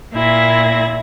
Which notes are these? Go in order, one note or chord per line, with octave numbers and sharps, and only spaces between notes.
A#2 E4 G#6 A#6